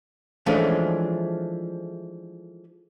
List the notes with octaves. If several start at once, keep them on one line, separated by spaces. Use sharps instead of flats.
E3 F3 G#3 A3 C#4 D4